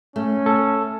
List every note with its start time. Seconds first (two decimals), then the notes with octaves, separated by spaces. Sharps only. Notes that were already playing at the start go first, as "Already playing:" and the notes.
0.16 A3 C#4
0.46 A4